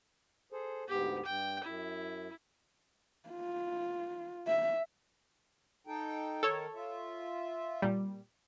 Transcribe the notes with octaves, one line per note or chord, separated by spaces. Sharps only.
G#4 A4 C5
D2 G#2 B3 G4
G2 G5
F#2 E4
F4
E5
D#4 A4 G5
D#3 A4 A#4 C#5
F4 E5
A#2 G3